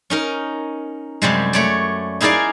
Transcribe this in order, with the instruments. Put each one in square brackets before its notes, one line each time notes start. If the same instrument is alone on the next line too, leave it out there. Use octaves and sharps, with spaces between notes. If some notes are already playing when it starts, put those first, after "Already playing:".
[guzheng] C#4 D#4 A#4
F#2 C3 G3 G#3
A3 C#5 D5
D#4 E4 G#4 A#4 D5 F5